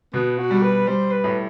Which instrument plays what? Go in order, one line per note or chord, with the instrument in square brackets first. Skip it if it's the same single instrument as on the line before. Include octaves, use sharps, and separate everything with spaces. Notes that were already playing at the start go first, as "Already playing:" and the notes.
[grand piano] B2 [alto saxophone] B3
[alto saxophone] F#4
[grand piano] G3
[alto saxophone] B4
[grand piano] G3 [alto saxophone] C5
[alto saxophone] B4
[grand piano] A2